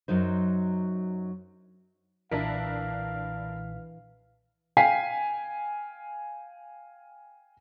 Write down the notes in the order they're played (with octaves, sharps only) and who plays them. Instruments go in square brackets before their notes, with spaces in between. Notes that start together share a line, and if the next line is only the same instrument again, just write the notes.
[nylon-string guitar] F#2 F#3 D#4 C5
[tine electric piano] B1 A#2 B6 [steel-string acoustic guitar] E3 [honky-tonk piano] D4 E4 A#4 [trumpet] F5
[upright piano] F5 G5 G#5 B6 C7